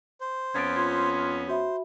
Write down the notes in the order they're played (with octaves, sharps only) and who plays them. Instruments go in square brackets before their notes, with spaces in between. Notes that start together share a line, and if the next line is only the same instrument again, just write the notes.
[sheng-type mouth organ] C5
[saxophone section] F2 B3 C#4 [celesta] G#6 A6 D7
[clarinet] F4 [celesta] G#6
[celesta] F#4 E5 B5 [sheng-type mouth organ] C5